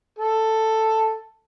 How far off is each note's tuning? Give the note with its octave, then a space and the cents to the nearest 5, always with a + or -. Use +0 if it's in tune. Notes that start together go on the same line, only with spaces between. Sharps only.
A4 +5